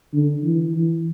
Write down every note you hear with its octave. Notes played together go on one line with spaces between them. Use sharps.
D3
E3
E3